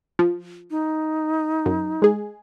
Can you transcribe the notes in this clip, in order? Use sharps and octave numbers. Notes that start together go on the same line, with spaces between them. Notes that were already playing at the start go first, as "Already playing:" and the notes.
F3
D#4
F#2
G#3 G#4